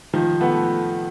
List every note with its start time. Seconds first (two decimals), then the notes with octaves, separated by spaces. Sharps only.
0.14 D#3 F3
0.41 A3 B3